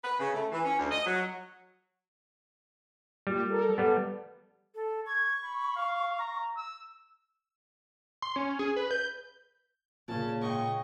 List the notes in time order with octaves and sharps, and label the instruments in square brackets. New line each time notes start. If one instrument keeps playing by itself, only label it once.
[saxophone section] B4
C#3
A3
E3
C#4
D2
D#5
F#3
[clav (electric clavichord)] G3 [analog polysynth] A#3 F4 G4
[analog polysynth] A4 A#4
[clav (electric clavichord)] G3 B3
[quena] A4
[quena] C#6 [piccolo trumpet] G#6
[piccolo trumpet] B5
F5
A#5
E6
[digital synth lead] C6
C#4
G#4
B4
G6
[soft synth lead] A#2 [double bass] C#3 [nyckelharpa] C#4 A5
[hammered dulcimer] G#2 G5 [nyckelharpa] D#5 C#6